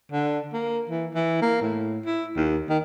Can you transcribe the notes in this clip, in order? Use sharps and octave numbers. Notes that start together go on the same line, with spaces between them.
D3
A#3
E3
E3
A#3
A2
E4
D#2
D#3